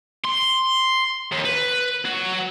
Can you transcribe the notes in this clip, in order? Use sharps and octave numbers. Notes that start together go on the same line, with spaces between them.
C6
D#2
B4
F#3